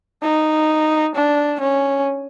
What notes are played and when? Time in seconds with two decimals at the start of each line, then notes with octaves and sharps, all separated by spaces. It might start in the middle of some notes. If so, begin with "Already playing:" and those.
0.23 D#4
1.15 D4
1.60 C#4